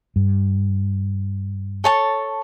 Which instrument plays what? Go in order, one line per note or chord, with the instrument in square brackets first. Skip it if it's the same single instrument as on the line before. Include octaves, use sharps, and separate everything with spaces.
[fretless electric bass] G2
[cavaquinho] A4 C#5 A5